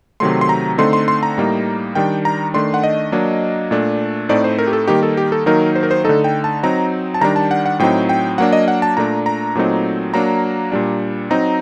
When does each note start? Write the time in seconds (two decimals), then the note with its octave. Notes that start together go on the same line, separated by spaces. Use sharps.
0.20 C3 D#3 F#3 A3 C6
0.41 C6
0.49 A#5
0.78 D3 A3 C4 D#4 C6
0.93 C6
1.08 C6
1.23 A#5
1.38 A2 G3 A#3 D#4
1.95 D#3 G3 D4 G5
2.25 A#5
2.54 D#3 A3 D4 C6
2.74 F#5
2.83 D#5
3.12 F#3 A#3 D4
3.71 A#2 A3 D4
4.29 A2 A3 C4 D#4 D5
4.44 C5
4.59 A#4
4.67 G4
4.73 A4
4.87 D#3 G3 A#3 D#4 G4
5.03 A4
5.17 G4
5.32 A4
5.46 D#3 F#3 A#3 D#4 A#4
5.76 C5
5.83 A#4
5.91 C5
6.05 D3 A3 D#4 A4
6.24 G5
6.44 A5
6.63 F#3 C4 D#4 A#5
7.14 A5
7.21 D#3 G3 D4 A#5
7.36 A5
7.51 F#5
7.66 F#5
7.79 A2 F#3 C4 D#4 G5
8.09 G5
8.38 F#3 A#3 D4 F#5
8.53 D#5
8.68 F#5
8.82 A5
8.97 A#2 A3 D4 A#5
9.26 A#5
9.55 A#2 F#3 A3 C4 D#4
10.14 F#3 A#3 D4 A#5
10.72 A#2 G3 D4
11.30 F#3 C4 D#4 A#5